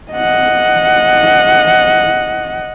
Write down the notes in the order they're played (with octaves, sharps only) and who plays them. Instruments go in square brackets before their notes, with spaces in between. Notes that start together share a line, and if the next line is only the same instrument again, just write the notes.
[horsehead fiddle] D#5 F#5